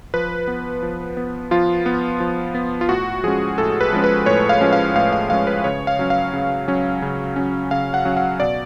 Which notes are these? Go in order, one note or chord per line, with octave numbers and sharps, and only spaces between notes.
F3 B4
B3
F3
B3
F3 F4
B3
F3
B3
F4
A2 F#4
F3 G#3 C#4 G#4
A2 A4
B4
F3 G#3 C#4
B4
A2 C#5
F5
F3 G#3 C#4
F5
A2 F5
F5
F3 G#3 C#4 F5
B4
C#3 C#5
F5
F#3 C#4
F5
C#3
F#3 C#4
C#3
F#3 C#4
C#3 F5
F#5
F#3 C#4
F5
B2 D5